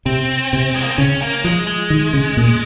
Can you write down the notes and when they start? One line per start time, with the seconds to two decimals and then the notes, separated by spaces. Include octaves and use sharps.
0.06 C3 C4
0.53 C3
0.75 G#3
0.83 A#3
0.91 C4
0.98 C#3 C#4
1.22 A#3
1.44 F3 G#3
1.67 G#3
1.90 D#3
2.13 C#3
2.37 A#2